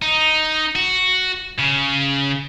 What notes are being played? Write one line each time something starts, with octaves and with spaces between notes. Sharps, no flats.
D#4
F#4
C#3